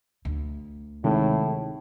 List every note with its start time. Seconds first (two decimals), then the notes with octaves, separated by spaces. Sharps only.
0.25 D2
1.04 A2 C3 D#3 G#3